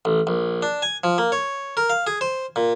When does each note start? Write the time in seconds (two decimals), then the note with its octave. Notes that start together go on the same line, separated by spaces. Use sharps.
0.05 A1
0.27 A#1
0.62 D4
0.82 G#5
1.04 F3
1.18 A#3
1.32 C#5
1.77 A#4
1.90 F5
2.07 G#4
2.21 C5
2.56 A#2